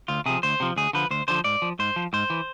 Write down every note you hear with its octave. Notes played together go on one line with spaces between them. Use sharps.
D2 F4
C3 F3 G#4
D2 C5
C3 F3
D2 G#4
D3 F3 B4
D2 C5
D3 F3 C5
G#2 D5
F3
G#2 C5
F3
G#2 C5
E3